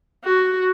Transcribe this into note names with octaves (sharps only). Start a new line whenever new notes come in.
F#4